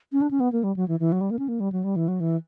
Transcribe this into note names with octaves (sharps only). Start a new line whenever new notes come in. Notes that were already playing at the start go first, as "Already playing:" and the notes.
C#4
D4
C#4
B3
A#3
G3
F#3
E3
E3
F#3
G3
A#3
C#4
A#3
G3
F#3
G3
E3
F#3
E3